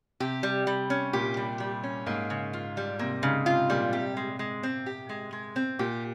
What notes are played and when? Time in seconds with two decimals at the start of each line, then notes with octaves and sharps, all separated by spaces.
0.20 C3 G4
0.43 G3
0.67 G3
0.90 C#4
1.13 A#2 G4
1.37 G3
1.60 G3
1.83 C#4
2.06 G#2 A#3
2.30 C#3
2.53 F4
2.77 G3
2.99 C3 A#3
3.23 G#2 C#3
3.46 C3 F4
3.70 A#2 G3
3.93 C3 G4
4.17 G#3
4.39 G#3
4.63 C4
4.86 G4
5.09 G#3
5.33 G#3
5.56 C4
5.79 A#2 G4